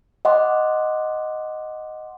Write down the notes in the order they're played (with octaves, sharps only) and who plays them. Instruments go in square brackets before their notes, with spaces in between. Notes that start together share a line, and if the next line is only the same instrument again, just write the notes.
[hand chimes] D#5 F#5 C6 D6